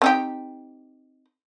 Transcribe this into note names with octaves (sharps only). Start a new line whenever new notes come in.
C4 D#4 G4